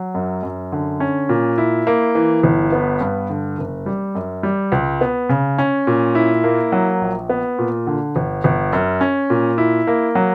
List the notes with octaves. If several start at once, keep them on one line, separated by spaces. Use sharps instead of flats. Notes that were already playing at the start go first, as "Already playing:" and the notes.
Already playing: F#3
F#2
F#2
D3
C#4
A#2
E4
A#3
E3
G1
B3
G2
D3
F#1
G3
F#2
G3
C#2
B3
C#3
C#4
A#2
E4
A#3
F#3
A#1
B3
A#2
D3
G1
G1
F#2
C#4
A#2
E4
A#3
F#3